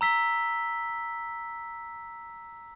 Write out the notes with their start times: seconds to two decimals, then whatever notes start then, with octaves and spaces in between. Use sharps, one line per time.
0.01 A#5 E6 B6 G7